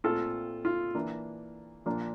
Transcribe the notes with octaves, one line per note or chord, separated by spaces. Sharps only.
A#2 A3 C4 F4 A4
F4
E3 A#3 D4
A#2 F3 A#3 D4